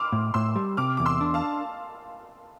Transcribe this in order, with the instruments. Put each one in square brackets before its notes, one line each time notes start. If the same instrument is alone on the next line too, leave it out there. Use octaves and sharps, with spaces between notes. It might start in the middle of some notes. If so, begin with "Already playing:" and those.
Already playing: [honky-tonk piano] C6 D6 E6 F6
[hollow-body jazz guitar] A2
[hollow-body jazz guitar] A2 [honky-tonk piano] C6 E6
[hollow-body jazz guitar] G3
[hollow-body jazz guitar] C3 [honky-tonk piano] D6 F6
[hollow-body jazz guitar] E2 [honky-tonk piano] D6
[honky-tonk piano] C6 E6
[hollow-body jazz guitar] D4
[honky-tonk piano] F5 A5